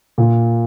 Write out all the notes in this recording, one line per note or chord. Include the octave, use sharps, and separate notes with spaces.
A#2